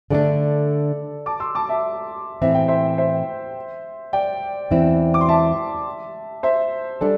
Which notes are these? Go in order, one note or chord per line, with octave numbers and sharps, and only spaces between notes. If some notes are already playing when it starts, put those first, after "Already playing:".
D3 A3 D4 A4 D5
A5 D6
C6 E6
A5 D6
E5 A5
A2 E3 C4 E5
G5
C5 E5
C5 E5
D5 G5
E2 E3 C4 E4
D6
C6
E5 A5
C5 E5
G3 D4 A4 D5